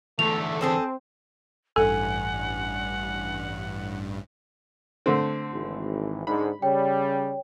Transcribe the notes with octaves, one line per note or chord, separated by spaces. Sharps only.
E2 D3 A3 F7
C4 G#4 A4 C5
A1 G2 A4 F#5 G#5
D3 A3 C4
G#1 E3
G#2 D3 B5
C#3 G3 C#5 G5